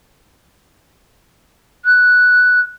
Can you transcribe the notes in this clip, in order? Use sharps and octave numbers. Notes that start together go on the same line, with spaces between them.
F#6